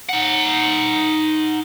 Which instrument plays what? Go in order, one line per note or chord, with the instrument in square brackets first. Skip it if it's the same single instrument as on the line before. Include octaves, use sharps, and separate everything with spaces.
[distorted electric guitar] D#4 F#5